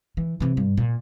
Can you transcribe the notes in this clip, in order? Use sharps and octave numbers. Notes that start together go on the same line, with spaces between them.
E3
C3 E3
G2
A#2